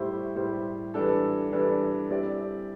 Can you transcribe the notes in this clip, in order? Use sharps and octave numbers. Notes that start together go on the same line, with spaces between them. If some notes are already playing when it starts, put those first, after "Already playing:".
Already playing: A2 G3 E4 G4 C5
A2 G3 E4 G4 C5
E3 G3 D4 A4
E3 G3 D4 A4
G3 C4 E4 G4 D5